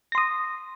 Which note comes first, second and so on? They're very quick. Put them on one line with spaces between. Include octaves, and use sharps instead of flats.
A#6 C6 D#6